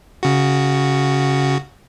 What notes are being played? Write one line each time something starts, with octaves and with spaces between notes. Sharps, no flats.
C#3 F#4